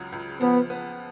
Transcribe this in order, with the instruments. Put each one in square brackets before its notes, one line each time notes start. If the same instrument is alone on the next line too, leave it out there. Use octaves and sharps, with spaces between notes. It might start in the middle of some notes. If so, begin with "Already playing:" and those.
Already playing: [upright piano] C#2 C#3 F#3
C#2
[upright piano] F3 [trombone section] B3
[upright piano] B3